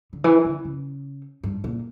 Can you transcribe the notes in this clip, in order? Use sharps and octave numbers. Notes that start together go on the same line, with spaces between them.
D3
E3
D3
C#3
G2
A#2